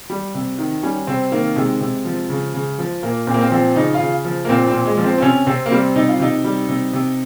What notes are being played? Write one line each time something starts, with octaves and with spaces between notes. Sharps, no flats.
G3
C3
D#3
G3 C#4
C3 C4
D#3 A#3
C3 G#3
C3
F3
C#3
C#3
F3
A#2 A#3
A#2 C4
A#3
C4
F3 C4
C#3 D#4
F4
C#3
F3
A#3
A#2 C4
C4
A#2
G#3
F3
C4
C4
C3 C#4
C3 C4
A#3
G3 C4
C3 D#4
F4
C3 D#4
G3
C3
C3